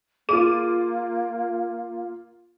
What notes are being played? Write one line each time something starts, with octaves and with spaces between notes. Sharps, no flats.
A#3 F4 G#4 D6 D#7